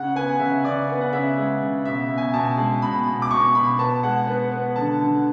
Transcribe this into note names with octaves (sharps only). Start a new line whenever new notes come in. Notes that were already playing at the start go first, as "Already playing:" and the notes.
Already playing: C#3 F#5
B3 G#5
C#3 E5
C#3 D5
B3
F#5
C#3 E5
G#3
C#3
B2 E5
B2
G#5
B2 A5
G#3
B2 B5
B2
D6
B2 C#6
B2 B5
B3 A5
G#3 F#5
B3
B3
D3 A5
D3